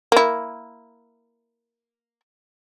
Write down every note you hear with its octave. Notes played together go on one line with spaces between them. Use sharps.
A#3 E4